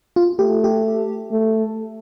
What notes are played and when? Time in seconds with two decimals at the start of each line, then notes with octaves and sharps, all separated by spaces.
0.16 F4
0.39 A3 G4
0.64 G4
1.32 A3